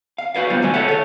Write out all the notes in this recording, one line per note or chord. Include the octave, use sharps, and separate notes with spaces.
F5
F#4 A4 B4 F5
G3 B3 F4 C5
A#2 D#3 A3 F#4 G#5
A4 C#5 E5 F#5
A4 C#5